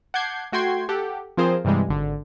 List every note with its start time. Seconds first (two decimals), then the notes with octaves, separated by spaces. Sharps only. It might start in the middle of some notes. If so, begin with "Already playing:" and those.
0.14 F#5 A5 D6 G6 G#6 C7
0.52 A3 F#4 G5 C6 G#6 C7
0.89 G4 A4 F#5
1.37 F3 C4 F4 G#4 A#4 C5
1.65 G2 C3 E3 G3 G#3
1.89 G#1 D3